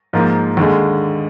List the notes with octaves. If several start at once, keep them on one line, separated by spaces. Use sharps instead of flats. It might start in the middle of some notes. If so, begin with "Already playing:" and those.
G#2 F3 A#3 F4
D#2 D3 G#3